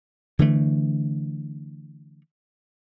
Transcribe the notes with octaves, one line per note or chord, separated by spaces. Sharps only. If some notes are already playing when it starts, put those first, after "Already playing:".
D3 E3 A3